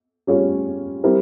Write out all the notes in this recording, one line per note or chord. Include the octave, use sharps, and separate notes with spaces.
G3 C#4 F4 G#4 C#5
G3 C4 E4 A#4